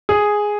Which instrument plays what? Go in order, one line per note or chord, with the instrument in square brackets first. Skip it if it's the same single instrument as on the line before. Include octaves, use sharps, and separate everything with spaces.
[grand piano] G#4